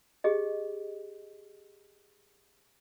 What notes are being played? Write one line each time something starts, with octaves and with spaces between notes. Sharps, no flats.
G4 G#4 D#5